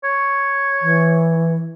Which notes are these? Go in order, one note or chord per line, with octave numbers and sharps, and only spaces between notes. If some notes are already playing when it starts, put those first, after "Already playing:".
C#5
E3